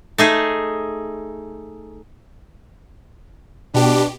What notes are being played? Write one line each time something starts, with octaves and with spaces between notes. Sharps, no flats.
A3 D#4 G#4
B2 D4 G4